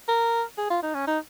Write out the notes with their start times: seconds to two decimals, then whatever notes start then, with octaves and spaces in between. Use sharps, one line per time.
0.08 A#4
0.58 G#4
0.70 F4
0.83 D#4
0.95 C#4
1.07 D#4